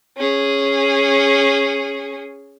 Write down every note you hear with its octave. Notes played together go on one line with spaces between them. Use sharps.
C#4 G#4